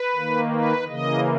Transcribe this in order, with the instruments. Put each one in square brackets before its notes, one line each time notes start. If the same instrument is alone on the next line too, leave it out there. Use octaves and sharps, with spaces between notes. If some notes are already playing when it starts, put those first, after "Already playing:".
Already playing: [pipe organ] B4
D#3 A#3
B4
C#3 E3 A#3 D#5